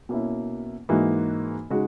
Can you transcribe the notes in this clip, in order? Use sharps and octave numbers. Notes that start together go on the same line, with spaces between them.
B2 A#3 C#4 E4
G#2 E3 A#3 D#4 F#4
C#3 G#3 D#4 F#4